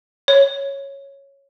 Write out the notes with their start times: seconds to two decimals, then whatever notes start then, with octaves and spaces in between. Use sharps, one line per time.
0.28 C#5